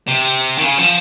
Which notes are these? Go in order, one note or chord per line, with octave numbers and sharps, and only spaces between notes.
C3
D#3
C#3
F3